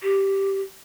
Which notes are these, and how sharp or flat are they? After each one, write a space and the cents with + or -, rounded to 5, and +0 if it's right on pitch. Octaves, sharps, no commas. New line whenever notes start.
G4 -5